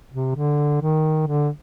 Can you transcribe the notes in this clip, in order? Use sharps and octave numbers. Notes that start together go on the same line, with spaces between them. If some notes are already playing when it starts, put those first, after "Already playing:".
C3
D3
D#3
D3